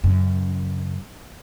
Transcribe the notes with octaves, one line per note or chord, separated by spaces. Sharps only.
F#2 C#3